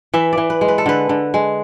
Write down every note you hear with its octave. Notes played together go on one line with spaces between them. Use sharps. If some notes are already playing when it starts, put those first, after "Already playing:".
E3 E5
D5
E3
B4
G#3
B4
A4
D3 B4
D3
G#3